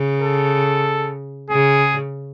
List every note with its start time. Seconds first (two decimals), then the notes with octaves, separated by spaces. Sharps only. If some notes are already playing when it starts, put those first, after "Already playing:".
Already playing: C#3
0.21 A4
1.50 C#3 G#4